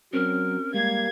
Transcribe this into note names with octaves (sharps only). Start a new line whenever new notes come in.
F#3 C4 C#4 A#4
G3 G#3 A#3 F5 G#6